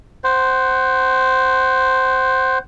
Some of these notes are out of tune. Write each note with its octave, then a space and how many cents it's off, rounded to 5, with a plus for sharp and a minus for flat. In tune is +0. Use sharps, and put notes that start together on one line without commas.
C5 +0 F#5 +25